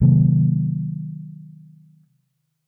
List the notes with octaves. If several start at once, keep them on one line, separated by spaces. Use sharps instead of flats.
C3 D#3 F#3 A#3